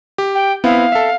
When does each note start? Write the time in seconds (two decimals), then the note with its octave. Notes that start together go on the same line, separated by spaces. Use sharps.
0.18 G4
0.35 G5
0.64 B3 C4 E4 F5
0.92 A4 E5